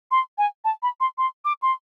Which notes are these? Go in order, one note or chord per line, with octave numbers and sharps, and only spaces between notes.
C6
G#5
A5
B5
C6
C6
D6
C6